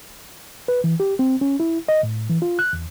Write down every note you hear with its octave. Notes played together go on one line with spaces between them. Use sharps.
B4
E3
G4
C4
C#4
E4
D#5
A2
E3
F4
F#6
E2